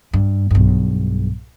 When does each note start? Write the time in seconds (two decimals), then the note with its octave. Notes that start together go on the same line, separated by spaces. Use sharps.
0.13 G2
0.51 B1 G2